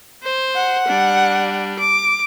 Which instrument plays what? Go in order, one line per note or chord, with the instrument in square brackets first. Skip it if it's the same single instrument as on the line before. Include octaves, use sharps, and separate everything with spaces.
[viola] C5
[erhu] F#5
[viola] G3 D4
D6